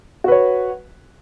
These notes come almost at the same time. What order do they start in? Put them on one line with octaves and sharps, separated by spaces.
F#4 B4 C#5